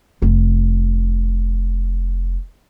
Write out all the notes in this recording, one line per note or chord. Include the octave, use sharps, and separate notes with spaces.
F1 F4